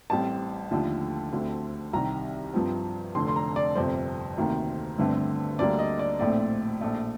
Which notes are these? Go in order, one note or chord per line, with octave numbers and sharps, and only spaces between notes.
A1 A2 G3 C4 A5
D#2 D3 F3 A3
D2 D3 A3 C4
C2 C3 D#3 A#5
G2 F3 C4
F1 F2 D3 C6
C6
A#5
D5
G1 F2 C3 C5
D2 C3 D#3 A#3
G1 G2 D3 A3 C4
D2 D3 G3 A#3 D5
D#5
D5
A#1 A2 A3 C4 D5
A#1 A2 A3